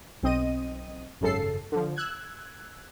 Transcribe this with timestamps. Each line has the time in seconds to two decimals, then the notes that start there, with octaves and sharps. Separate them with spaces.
0.23 B1 C4 D#5 D#7
1.21 G#1 F#2 C#3 A4 C7
1.72 D3 F3
1.96 E6 F#6 G#6